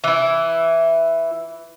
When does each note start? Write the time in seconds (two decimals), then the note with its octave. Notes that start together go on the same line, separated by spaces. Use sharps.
0.04 E3 E4